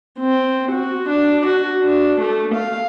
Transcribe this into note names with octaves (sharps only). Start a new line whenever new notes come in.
C4
F#4
D4
F#4
D4
A3
F5